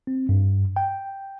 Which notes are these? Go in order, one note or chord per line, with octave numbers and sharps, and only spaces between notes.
C4
G2
G5